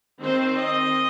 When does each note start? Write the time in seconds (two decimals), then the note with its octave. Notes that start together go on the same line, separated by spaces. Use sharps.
0.22 D#3 C4 C5
0.56 D#5